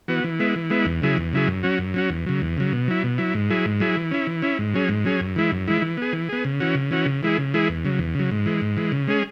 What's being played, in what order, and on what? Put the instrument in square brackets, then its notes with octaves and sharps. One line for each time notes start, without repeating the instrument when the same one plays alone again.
[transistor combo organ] E3 B3 F#4
E3
G#3 B3 E4
E3
G#3 B3 E4
E2
C#3 F#3 E4 G#4
E2
C#3 F#3 E4 G#4
F#2
F#3 C#4 F#4
F#2
F#3 C#4 F#4
E2
C#3 F#3
E2
C#3 F#3
B2
F#3 E4
B2
F#3 E4
G#2
F#3 E4 G#4
G#2
F#3 E4 G#4
E3
C#4 E4
E3
C#4 E4
G#2
F#3 C#4 G#4
G#2
F#3 C#4 G#4
F#2
E3 G#3 E4
F#2
E3 G#3 E4
E3
B3 G#4
E3
B3 G#4
C#3
E3 C#4 F#4
C#3
E3 C#4 F#4
C#3
E3 G#3 E4 G#4
C#3
E3 G#3 E4 G#4
E2
C#3 F#3
E2
C#3 F#3
G#2
E3 G#3
G#2
E3 G#3
C#3
G#3 C#4 G#4